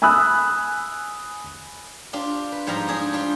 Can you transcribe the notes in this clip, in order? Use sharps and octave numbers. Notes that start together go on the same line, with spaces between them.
G#5 B5 D#6 E6 F#6
D4 F4 G4 C5
B4
G#2 F3 G3 F4 F5 A#5
D4 G#4 A#5
G3 D4 F4